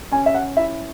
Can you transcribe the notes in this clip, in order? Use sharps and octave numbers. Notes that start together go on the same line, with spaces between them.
C#4 G#5
E5
F#5
E4 E5